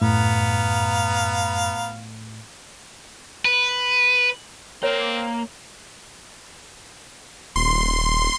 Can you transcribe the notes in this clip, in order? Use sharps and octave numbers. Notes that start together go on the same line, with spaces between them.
F#2 A2 B3 F5 A#5
B4
A#3 C4 C#5
D#1 C6